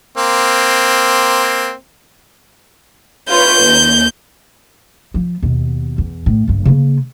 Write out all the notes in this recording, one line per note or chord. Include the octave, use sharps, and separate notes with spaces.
A#3 C4
F4 B4 C#5 G6
D#2
F3
D#2 B2
E2
A2
F#1 G2
C#3 A#3